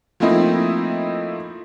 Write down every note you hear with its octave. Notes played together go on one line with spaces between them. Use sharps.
F3 A3 A#3 C4 D#4 E4